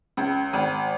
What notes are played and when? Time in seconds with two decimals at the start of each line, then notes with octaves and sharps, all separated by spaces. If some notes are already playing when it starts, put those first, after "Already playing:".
0.17 C#2
0.53 G#1